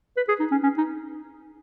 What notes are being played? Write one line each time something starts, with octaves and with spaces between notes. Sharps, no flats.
B4
G#4
D#4
C#4
C#4
D#4